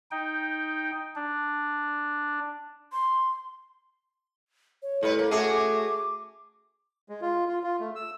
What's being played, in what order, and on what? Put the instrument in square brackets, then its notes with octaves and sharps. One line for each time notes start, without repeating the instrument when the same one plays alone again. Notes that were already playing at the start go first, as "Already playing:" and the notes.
[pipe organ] D#4 G5
D4
[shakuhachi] C6
[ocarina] C#5
[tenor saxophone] A2 [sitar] G3 B4
[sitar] A#3 [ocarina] A#4
[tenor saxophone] A3 [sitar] C#4 F#4 G#4 [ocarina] D6
[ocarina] D6
[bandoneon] G#3
F4
F4
F4
A3
E6